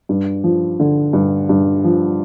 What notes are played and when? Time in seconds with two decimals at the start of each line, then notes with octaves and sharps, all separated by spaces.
0.09 G2
0.44 F3
0.80 D3
1.13 G2
1.49 G2
1.84 F3